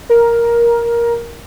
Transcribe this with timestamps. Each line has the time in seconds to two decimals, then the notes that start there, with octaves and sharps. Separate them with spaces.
0.09 A#4